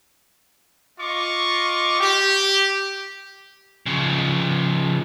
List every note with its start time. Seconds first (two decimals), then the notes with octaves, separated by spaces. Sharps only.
1.00 F4 D#5 C#6 D6
2.00 G4
3.86 C#3 F3